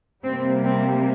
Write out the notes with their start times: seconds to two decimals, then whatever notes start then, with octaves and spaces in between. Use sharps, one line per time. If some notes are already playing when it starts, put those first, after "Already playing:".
0.24 C3 G3 A#3 C4
0.64 C4